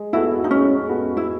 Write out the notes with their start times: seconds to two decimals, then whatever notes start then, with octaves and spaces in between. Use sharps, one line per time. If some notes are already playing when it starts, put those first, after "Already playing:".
Already playing: G#3
0.13 B3 E4 F#4 A4
0.44 D#4
0.51 G#3 C#4
0.88 B3 F#4 A4
1.17 E4